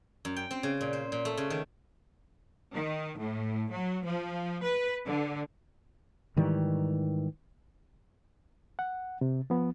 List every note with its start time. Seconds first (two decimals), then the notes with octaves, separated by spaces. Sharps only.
0.25 F#2
0.36 G5
0.51 C4
0.63 C#3
0.81 A#2
0.93 C5
1.12 A#2
1.25 A3
1.37 C#3
1.50 D#3
2.73 D#3
3.18 A2
3.71 F#3
4.05 F3
4.63 B4
5.07 D3
6.37 G#2 D#3 E3 G3
8.79 F#5
9.21 C3
9.50 F3 B3